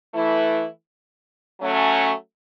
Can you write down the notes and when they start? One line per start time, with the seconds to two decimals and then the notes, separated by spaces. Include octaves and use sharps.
0.14 E3 A3 E4
1.61 F#3 A3 C#4